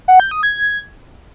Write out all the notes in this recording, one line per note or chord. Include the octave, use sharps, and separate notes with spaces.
F#5
G6
D#6
G#6